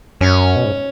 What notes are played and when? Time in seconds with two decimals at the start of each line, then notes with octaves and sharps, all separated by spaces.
0.21 F#2 C#4
0.56 B2
0.65 G#2